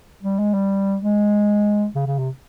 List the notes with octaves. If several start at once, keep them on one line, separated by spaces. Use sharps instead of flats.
G3
G#3
G3
G#3
C#3
C#3
C3